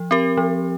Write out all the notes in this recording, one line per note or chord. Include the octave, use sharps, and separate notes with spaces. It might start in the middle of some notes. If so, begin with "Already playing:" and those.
Already playing: F3
C4 G4 A#4
F3